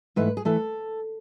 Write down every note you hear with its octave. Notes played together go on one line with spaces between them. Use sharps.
G#2 E3 A3 B4
G#4
E3 A3 A4